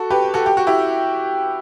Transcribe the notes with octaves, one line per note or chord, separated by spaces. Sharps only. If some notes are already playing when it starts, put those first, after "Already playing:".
Already playing: F#4 A4
G4 B4
F#4 A4
G4
F#4
E4 G4